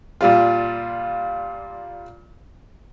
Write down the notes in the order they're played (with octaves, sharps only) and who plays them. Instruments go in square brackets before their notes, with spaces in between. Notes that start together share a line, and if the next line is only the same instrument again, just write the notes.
[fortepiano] A#2 G3 F4